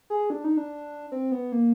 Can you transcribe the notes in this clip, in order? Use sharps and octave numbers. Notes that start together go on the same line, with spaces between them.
G#4
D4
D#4
D4
C4
B3
A#3